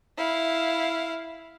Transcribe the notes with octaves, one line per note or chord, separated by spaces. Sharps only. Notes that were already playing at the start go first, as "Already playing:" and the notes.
E4 F5